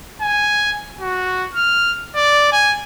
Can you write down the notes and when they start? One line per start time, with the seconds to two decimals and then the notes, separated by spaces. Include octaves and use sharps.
0.21 G#5
1.00 F#4
1.54 F6
2.16 D5
2.52 G#5